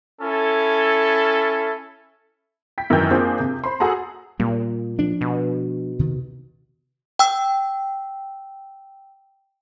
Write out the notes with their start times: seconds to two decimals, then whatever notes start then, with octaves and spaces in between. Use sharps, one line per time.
0.20 C#4 E4 A4
2.78 G5 B6
2.90 F#2 D#3 E3 G5 G6
3.11 A#3 C4 D4 F4 G#4 C5
3.40 C3
3.64 C5 B5 C6
3.80 F#4 G#4 A4 F#5 A#5
4.40 A#2 G3 A#3
4.99 F3 D4
5.21 B2
5.99 C3 D#3
7.19 G5 E6